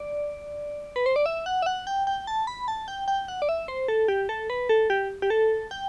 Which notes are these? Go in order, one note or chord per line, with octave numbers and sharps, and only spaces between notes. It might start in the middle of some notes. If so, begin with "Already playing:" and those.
Already playing: D5
B4
C5
D5
E5
F#5
E5
F#5
G5
G5
A5
B5
A5
G5
G5
F#5
D5
E5
C5
A4
G4
A4
B4
A4
G4
G4
A4
G5